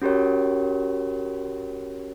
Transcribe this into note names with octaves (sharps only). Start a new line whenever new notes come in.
C#4 F#4 G4 A#4 C#5